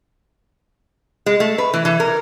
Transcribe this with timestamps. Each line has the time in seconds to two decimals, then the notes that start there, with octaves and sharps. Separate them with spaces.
1.26 G#3
1.40 A3
1.58 B4
1.73 E3
1.85 E3
2.00 A#4